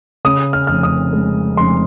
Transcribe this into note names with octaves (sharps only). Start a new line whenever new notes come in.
C#3 D#6
F6
F1 F6
D#6
G#3
F1 C6